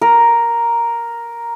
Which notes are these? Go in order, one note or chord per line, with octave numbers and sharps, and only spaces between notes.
A#4